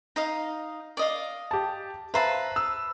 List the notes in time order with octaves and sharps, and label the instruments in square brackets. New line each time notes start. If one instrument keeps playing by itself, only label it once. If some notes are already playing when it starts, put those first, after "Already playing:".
[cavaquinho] D#4 D#5 F5
D5 D#5 F5
[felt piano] G4 A5
[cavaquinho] B4 C5 A5 [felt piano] E5 F5 A#5
[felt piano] E6